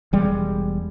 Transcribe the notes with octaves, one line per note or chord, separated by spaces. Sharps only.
E1 G3 G#3